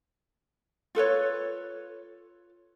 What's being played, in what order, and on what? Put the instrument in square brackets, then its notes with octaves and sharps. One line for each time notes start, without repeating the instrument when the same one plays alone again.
[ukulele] F4 A4 B4 C#5